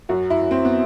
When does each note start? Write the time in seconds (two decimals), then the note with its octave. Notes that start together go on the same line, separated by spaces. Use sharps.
0.09 F#2 F#4
0.30 E4
0.41 F#2
0.51 C4
0.65 B3